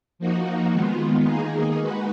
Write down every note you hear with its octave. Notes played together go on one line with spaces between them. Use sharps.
F3 A#3 D#4 F#4
D#3 G#3 B3 F4
D#3 A#3 D#4 G#4
G#3 D#4 F#4 B4